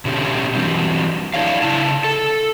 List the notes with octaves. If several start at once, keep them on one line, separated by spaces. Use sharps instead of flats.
B2 D3 C#4 G4
E3 F#3 G3 C4
D4 E4 C#5 F5
C#3 E4 A5
A4